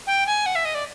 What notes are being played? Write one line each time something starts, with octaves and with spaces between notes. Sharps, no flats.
G5
G#5
F#5
E5
D#5
D5